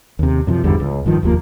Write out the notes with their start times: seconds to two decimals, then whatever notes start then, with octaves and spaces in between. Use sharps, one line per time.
0.19 D#2 C3
0.47 F#2 C3 F3
0.63 G#1 E2 D3 G3
0.80 C#2
1.05 F1 G2 D#3 F3
1.23 F1 D#2 F3 A#3